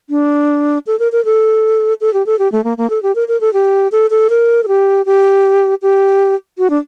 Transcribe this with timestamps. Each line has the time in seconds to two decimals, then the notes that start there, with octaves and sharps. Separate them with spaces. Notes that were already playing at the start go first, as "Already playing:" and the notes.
0.10 D4
0.87 A4
0.99 A#4
1.12 A#4
1.25 A4
2.01 A4
2.14 G4
2.26 A4
2.39 G4
2.52 A3
2.64 A#3
2.78 A#3
2.90 A4
3.03 G4
3.15 A#4
3.28 A#4
3.41 A4
3.53 G4
3.92 A4
4.10 A4
4.30 A#4
4.63 A4
4.68 G4
5.06 G4
5.82 G4
6.58 F#4
6.70 D4